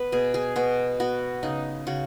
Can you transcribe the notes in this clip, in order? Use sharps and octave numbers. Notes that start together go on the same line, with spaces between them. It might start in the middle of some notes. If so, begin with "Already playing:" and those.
Already playing: B3 B4
B2 G#4
G#4
B2 F#4
B3 F#4
C#3 D#4
C#3 F#4